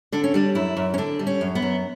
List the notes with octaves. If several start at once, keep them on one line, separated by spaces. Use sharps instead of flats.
D3 D4
C#4
G3 D4
F#2 E4
F#2
C#4
D3 D4
G3
C#4
F#2
B3
F#2